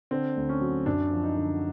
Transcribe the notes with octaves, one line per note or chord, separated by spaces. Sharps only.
D3 C4
D2
C#4
F#3
F#2 D4
F3
D#4
D3